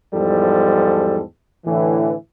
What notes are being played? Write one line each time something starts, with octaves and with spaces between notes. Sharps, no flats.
E2 G#2 F3 G3 A4
A2 D3 E3